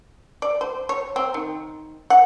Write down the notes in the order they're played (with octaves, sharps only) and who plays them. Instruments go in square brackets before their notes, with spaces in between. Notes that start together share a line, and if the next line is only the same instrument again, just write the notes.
[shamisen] D5
C5
C#5
C4
D#3
F#5